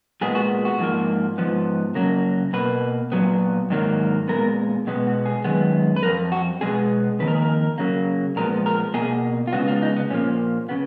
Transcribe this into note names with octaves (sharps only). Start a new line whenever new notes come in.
A#2 G#3 B3 G#4
F#4
F#4
G#2 F3 A#3
G#2 F3 B3
F#2 C#3 F#3 A#3 A#4
B2 A#3 B4
A#2 F#3 B3
G#2 D#3 F#3 A#3
A#2 G#3 B3 A#4
B2 G#3 B3
F#4
G#4
F#2 D#3 G#3 B3
B4
F2 F3 A#4
F#4
B2 G#3 B3 G#4
F2 D#3 A#3 B4
A#4
G#4
A#4
C#3 F#3 A#3
A#2 F3 G#3 B3 A#4
A#4
B2 A#3 G#4
F4
C#3 G#3 B3 F#4
F4
D#4
B3
A#2 F3 A#3 C#4
C#3 B3